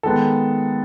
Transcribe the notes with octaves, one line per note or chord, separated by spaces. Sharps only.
D#3 G#3 B3 A4